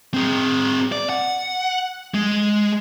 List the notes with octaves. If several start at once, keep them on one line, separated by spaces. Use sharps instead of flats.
C4 G#4
D5
F#5
G#3